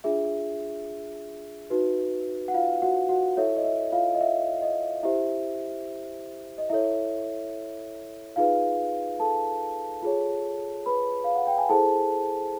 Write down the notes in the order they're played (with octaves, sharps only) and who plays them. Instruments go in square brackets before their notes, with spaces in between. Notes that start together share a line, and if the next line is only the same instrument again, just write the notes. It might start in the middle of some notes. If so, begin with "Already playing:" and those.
[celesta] D4 F4 G#4 E5
D#4 F#4 B4
F#5
F4 F5
F#4 F#5
F#4 F#5
E4 A4 C#5 E5
D#5
E5
F4 F5
D#5
E5
D#5
E4 G4 C5 E5
D#5
E4 A4 C#5 E5
D#4 F4 G#4 B4 F5
A4 A5
F4 G#4 C#5
B4 B5
F5
F#5
G5
G#5
E4 G#4 A4 C5 A5